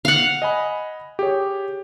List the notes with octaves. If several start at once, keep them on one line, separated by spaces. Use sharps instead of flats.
F5 F#5
D#5 G#5 B5
G4 G#4 C#5